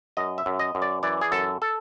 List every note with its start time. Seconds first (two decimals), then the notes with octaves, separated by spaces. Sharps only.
0.17 F#2 D#5
0.38 E5
0.46 F#2
0.59 D#5
0.75 F#2
0.82 D5
1.03 E3 D5
1.21 G#4
1.32 F#2 A4
1.62 A4